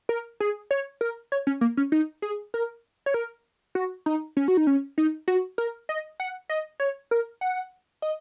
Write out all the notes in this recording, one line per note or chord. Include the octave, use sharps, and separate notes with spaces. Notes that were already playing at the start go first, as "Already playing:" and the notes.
A#4
G#4
C#5
A#4
C#5
C#4
A#3
C#4
D#4
G#4
A#4
C#5
A#4
F#4
D#4
C#4
F#4
D#4
C#4
D#4
F#4
A#4
D#5
F#5
D#5
C#5
A#4
F#5
D#5